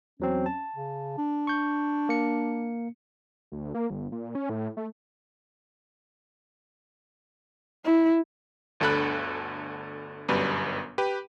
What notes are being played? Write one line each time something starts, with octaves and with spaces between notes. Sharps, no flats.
E2 F#3 C4 C#4
A5
C#3
D4
C#6 G6
A#3 C#7
D2
A#3
G1
A#2
C#4
A2
A3
E4
G1 D2 D3 A4 B5 F#6
G1 F#2 B2 G3 B4
G4 B4